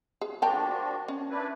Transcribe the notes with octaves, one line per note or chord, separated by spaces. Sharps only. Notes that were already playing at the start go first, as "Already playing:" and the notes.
G#4
F3 D4 F#4 A#4 G5 A5
C#4
D4 E4 B4